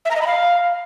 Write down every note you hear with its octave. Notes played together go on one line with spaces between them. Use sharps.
E5
A#5
D#5
B5
F5